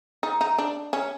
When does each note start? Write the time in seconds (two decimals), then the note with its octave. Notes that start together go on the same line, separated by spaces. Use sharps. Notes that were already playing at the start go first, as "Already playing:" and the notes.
0.23 D#4
0.41 D#4
0.58 D4
0.93 C#4